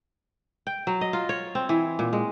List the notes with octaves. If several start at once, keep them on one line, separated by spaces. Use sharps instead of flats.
G5
F#3
D#5
F4
C#5
C4
E3
A#2
G#3